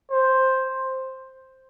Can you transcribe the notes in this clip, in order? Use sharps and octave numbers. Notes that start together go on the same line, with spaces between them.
C5